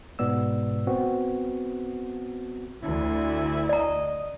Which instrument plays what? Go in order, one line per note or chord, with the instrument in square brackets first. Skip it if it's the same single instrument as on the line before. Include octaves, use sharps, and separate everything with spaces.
[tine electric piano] G#2 B2 B3 D5 E6
B3 C4 F#4
[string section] D2 [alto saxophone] E4
[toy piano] D5 A#5 [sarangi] D#5